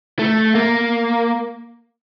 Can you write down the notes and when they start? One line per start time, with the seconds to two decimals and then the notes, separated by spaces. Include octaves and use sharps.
0.19 A3
0.55 A#3